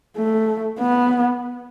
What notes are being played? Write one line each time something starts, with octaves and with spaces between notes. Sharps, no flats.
A3
B3